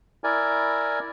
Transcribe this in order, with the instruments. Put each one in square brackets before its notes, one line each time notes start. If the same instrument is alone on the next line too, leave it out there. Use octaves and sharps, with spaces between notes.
[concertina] E4 A#4 D5 G#5